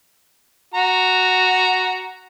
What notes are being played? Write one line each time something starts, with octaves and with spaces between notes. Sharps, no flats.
F#4 A#5